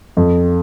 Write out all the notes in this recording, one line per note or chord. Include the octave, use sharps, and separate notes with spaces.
F2